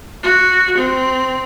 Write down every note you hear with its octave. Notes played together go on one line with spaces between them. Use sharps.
F#4
C4